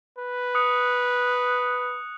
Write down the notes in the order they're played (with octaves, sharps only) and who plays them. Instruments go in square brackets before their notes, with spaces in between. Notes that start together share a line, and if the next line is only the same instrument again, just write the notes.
[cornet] B4
[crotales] D#6 F#6 C#7